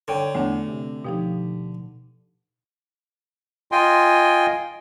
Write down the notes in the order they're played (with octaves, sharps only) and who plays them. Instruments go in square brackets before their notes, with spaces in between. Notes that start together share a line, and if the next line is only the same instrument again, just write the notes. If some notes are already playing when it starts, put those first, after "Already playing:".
[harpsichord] D3 [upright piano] C#5 G5
[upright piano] E2 [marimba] A3 D4
[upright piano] C3
[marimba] B2 F3 D#4 [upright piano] G4
[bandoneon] F4 D#5 G5 G#5 C6